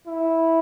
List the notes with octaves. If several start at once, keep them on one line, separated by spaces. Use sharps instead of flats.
E4